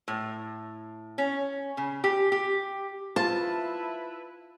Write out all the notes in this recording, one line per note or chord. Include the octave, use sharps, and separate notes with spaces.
A2
C#4
C#3
G4
G4
E4 F4 B4 C5 E5 A5